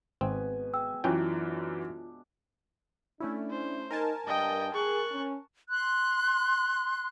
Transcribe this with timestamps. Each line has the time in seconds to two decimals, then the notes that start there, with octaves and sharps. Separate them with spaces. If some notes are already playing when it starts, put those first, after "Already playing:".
0.21 G#1 B2 G#3 C4 G#5
0.74 G#4 E5 G5 E6
1.04 F#2 E3 C#4 D4 F4 G5
3.20 A3 C#4 D4 E4
3.50 C5
3.91 D#4 A#4 G#5 A5
4.27 G2 D#5 G5
4.74 G#4 C#6 F#6
5.12 C#4
5.70 C6 F#6